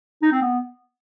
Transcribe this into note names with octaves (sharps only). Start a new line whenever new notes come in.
D#4
C4
B3